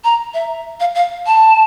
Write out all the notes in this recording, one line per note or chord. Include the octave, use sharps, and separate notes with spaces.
A#5
E5
F5
F5
A5